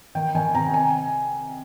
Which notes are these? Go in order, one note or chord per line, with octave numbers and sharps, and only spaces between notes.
D#3 G5
D#3 G#5
C3 A#5
G#5